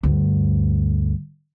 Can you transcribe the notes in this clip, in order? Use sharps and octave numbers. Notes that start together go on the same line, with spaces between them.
D2 G2